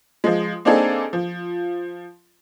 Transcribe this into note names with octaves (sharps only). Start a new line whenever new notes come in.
F3 G#3
A#3 C4 D4 D#4 G#4 A4
F3